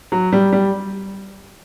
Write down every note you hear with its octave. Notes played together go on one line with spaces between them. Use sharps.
F#3
G3
G3